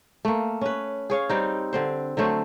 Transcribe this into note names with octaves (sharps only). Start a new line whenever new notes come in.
A3 A#3
C#4 B4
G#4 C#5 F5
G3 C4 D#4
D3 C4 C5
D3 F#3 A3 C5